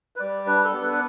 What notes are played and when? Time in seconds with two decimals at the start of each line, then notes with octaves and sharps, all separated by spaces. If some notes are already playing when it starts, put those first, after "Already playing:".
0.16 B4
0.20 G3 D5
0.47 D4 B4
0.64 A4
0.73 B3
0.82 B4
0.93 B4